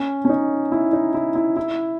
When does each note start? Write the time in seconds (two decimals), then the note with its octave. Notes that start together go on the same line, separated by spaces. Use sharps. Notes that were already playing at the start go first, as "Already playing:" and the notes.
Already playing: C#4
0.25 C#4
0.29 D#4
0.72 E4
0.93 D#4
1.14 E4
1.35 E4
1.57 E4